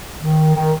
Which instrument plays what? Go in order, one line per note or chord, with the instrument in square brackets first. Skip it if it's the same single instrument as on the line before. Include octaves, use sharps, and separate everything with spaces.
[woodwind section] D#3
D#3